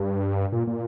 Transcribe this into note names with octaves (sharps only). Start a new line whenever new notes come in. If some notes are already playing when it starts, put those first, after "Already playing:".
Already playing: G2
A#2
A#2